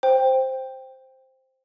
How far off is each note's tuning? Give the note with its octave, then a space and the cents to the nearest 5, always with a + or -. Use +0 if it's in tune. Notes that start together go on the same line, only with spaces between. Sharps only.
C5 +0 G5 +10